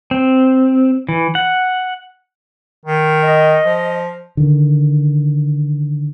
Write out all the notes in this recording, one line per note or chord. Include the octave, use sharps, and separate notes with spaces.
C4
E3
F#5
D#3
D#5
F3
D3 D#3